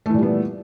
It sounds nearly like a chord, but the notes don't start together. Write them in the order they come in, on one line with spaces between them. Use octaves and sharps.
A3 E3 A#2 G3 B3